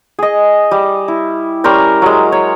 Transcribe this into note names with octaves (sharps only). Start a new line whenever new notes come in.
G#4 D#5
G3
E4
G3 C#4 A#4 C5
F#3 G#3
C#5